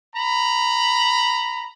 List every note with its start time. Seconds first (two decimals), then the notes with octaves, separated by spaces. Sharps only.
0.15 A#5 B5